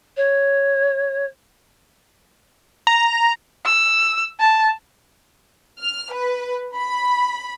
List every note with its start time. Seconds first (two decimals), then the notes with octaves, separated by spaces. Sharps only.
0.16 C#5
2.87 A#5
3.65 E6
4.39 A5
5.80 F6
6.12 B4
6.76 B5